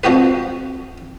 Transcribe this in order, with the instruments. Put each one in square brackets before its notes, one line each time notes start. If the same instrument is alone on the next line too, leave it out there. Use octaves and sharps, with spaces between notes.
[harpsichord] F2 F3 F#4 G4 B4